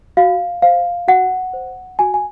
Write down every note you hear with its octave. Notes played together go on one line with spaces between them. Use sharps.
F#4 F5
C5 F5
F#4 F#5
C5
F#4 G#5
G#5